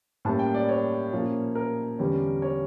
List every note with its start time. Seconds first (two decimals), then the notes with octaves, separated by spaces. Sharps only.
0.25 A2 G3 A#3 C#4 A5
0.39 G5
0.54 D5
0.69 C#5
1.13 A#2 F3 A#3 C#4
1.55 A#4
1.99 E2 D3 G3 C#4
2.42 C#5